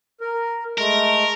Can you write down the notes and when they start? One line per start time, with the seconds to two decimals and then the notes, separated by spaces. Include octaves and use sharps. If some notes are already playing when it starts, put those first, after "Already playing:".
0.21 A#4
0.78 G#3 A3 A#4